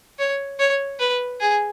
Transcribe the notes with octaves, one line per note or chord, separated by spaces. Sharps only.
C#5
C#5
B4
G#4